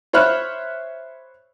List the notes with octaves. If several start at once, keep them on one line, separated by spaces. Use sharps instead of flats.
C5 C#5 E5 B5 F6 F#6